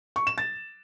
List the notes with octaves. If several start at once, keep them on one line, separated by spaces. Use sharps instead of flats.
C#6
E7
A6